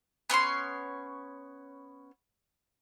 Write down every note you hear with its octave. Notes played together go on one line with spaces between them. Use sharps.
B3 C#4 C#5 C6